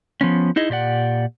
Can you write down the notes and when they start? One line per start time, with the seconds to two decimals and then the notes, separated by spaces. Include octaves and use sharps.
0.21 F3 B3 C#4
0.56 D#4 E4 G#4 D#5
0.70 A#2 G4 D5 F#5